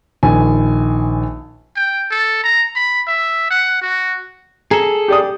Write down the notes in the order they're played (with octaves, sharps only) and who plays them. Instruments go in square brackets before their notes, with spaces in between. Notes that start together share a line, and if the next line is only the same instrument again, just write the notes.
[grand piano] A#1 D#3 G#5
[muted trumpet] G5
A4
A#5
B5
E5
F#5
F#4
[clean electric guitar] G#4 A4 [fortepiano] A#5
[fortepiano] G4 D5 D#6